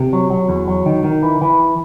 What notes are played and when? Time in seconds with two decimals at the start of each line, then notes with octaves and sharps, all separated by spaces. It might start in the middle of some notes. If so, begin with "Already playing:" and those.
Already playing: C3
0.13 F#3
0.30 F#3
0.49 E2
0.68 F#3
0.86 D#3
1.04 D#3
1.23 E3
1.41 E3